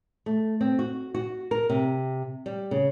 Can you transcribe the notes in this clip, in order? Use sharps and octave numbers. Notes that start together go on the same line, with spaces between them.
A3
C4
F#4
F#4
A#4
C3
G3
C#3